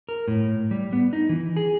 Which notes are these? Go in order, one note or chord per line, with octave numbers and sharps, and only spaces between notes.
A#4
A2
G3
B3
D#4
E3
G#4